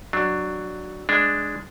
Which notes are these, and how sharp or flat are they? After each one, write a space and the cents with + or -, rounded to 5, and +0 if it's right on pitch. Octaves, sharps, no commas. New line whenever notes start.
F#3 +5 D4 +15
G#3 +0 D4 +0